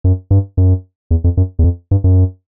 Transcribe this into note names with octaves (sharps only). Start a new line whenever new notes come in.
F#2
G2
F#2
E2
F2
F#2
E2
F2
G2
F#2